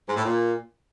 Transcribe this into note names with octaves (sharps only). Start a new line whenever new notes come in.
G#2
A2
A#2